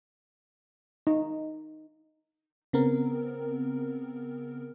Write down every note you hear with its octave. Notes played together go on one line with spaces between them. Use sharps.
D#4
C#3 B3 C4 A#4